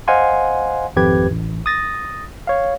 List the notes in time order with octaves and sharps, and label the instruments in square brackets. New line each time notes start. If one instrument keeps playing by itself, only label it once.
[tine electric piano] C5 D#5 F5 F#5 G#5 C6
G#1 F2 G4 B4 G#6
A1
D#6 A6 A#6
C#5 F5